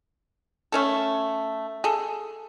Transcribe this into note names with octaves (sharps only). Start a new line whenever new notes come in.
A3 C#4 A4
G#4 A4